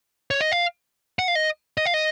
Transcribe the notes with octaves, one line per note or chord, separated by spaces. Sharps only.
C#5
D#5
F5
F#5
F5
D#5
D#5
F5
D#5